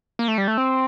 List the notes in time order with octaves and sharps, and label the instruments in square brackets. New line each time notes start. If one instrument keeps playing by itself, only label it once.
[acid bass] A#3
A3
G3
A3
C4